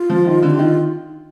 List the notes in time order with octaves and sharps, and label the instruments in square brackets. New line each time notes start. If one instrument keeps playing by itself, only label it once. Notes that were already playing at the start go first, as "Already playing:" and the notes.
Already playing: [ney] F4
[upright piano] F3
D#3
D3
[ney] G4
[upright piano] D#3 [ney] F4